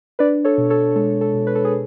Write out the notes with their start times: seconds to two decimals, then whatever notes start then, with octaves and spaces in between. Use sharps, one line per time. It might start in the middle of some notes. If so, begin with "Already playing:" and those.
0.19 D4 B4 D5
0.45 A4 C#5
0.58 B2
0.70 A4 C#5
0.96 G#3 A4
1.21 A4
1.34 B2
1.47 B4
1.55 A4
1.65 G#4